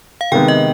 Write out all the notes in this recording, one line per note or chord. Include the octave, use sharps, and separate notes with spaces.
F5
C3 D#3 G#3 B3 G5
D#5